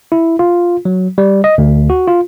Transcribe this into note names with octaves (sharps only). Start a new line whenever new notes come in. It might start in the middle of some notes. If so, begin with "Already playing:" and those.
E4
F4
F#3
G3
D#5
D2
F#4
F4